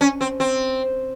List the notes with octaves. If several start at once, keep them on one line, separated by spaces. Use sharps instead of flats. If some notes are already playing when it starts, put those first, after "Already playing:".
C#4
C4
C4